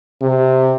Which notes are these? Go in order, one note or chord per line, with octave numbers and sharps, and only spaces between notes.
C3